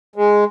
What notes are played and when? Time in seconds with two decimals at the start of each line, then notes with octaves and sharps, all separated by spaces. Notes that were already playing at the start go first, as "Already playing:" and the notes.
0.16 G#3